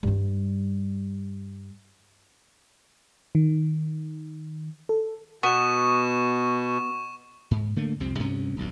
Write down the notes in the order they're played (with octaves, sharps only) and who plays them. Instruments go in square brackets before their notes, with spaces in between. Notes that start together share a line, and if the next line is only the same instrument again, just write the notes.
[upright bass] G2 G3
[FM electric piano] D#3
A4
[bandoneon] B2 [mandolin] B3 [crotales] C#6 E7
[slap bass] G#2
D3 A3 A#3
C2 F2 C3 C4
D2 G2 C3 C#4
D#1 B1 G2